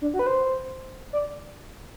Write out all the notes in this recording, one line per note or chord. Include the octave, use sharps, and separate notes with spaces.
D4
F#4
B4
C5
D5